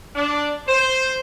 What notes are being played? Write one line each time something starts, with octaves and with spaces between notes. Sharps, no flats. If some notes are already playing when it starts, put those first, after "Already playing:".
D4
C5